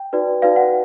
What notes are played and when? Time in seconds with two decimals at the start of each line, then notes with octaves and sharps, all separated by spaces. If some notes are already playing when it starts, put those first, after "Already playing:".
Already playing: G5
0.13 D#4 F#4 B4 D5
0.42 D#4 F#4 B4 D5 F5
0.56 F#5